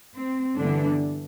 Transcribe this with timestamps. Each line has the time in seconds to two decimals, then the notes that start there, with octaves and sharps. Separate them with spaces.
0.15 C4
0.57 G2 D3 E3 G3 B3 D4